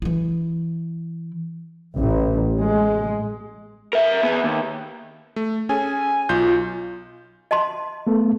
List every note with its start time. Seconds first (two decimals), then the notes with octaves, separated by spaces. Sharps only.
0.02 E3 E4
1.96 A1
2.58 G#3
3.93 A#4 E5
4.23 B3 G#4
4.44 D#2
5.36 A3
5.69 C#4 G#4 A4 G#5
6.29 B1 F4 G6
7.51 D#5 A5 C6
8.07 A3 B3 A4